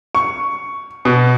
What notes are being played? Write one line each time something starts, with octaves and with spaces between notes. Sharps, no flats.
C#6
B2